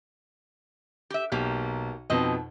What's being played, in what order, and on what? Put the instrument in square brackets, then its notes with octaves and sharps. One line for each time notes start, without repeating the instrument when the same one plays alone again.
[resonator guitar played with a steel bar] G4 E5
[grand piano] B1 [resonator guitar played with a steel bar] A#3 G4
[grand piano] F2 B2 D#4 [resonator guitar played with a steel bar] C4 D#5